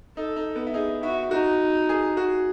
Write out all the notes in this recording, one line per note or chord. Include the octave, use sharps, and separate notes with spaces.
D#4 A4
D#4
B3
E4
D#4 G#4
E4 F#4
D#4 F#4
G#4
F#4